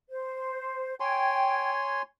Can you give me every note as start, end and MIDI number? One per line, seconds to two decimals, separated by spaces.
0.10 0.94 72
1.00 2.02 73
1.00 1.71 79
1.00 2.02 80
1.00 2.02 84